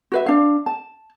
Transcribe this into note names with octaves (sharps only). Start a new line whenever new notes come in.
F#4 B4 E5
D4 F5
A5